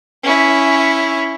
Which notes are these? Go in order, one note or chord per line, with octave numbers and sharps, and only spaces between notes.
C#4 E4